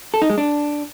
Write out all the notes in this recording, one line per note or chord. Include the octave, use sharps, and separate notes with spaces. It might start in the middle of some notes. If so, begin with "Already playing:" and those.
A4
D#4
G#3
D4